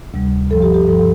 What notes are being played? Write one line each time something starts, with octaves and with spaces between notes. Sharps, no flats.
D2 C3 G3
G2 F3 A4
G4
G4
G2 F3 A4
A4